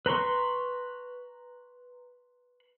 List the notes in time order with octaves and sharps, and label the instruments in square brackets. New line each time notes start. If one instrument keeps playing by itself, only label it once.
[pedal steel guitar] B4 A#5 C6 C#6